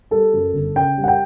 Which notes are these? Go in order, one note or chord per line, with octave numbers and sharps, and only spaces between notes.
G3 A4
F#2
G1
C#3 G5
G3
F#5
G5